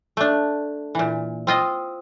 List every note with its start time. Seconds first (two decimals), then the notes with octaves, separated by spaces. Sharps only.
0.17 A3 D4
0.95 A#2 E3
1.47 C4 F4 D#5